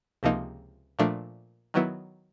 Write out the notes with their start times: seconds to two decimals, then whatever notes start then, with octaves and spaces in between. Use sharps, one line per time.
0.23 C#2 C3 F3 A#3 D#4
0.99 A#2 F3 A3 D4
1.74 D#3 F#3 B3 E4